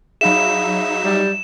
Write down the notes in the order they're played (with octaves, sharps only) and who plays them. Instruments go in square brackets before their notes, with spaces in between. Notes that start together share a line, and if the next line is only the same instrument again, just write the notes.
[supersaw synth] F#3 D#4 E5 [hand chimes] G#4 F5 B5 [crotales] E7
[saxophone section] G3